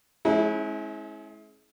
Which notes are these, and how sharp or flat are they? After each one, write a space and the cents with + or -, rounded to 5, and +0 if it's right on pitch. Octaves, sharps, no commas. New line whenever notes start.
G#3 +30 C#4 -35 E4 -30